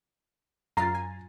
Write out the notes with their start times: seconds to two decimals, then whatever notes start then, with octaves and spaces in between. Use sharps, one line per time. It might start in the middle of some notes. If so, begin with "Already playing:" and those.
0.77 F#2 F4 A#5 A6 C7
0.95 G#5